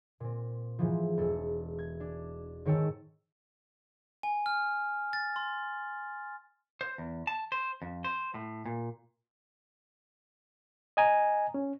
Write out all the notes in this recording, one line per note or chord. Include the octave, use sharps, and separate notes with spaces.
A#2 C4
G#2 E3 F3
E1 A4
G#6
D4
G#2 D#3 C#5 G5 A5 E6
G#5
F6
A6
C6
C5
E2
A5
C5
F2
C5
A2
A#2
D#5 G#5 A#5
C#4